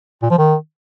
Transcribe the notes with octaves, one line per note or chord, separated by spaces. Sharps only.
A#2
F3
D#3